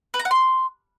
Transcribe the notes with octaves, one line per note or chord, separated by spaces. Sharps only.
B4
A#5
F#5
C6